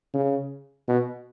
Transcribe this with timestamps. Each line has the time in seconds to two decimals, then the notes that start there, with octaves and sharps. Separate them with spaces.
0.14 C#3
0.88 B2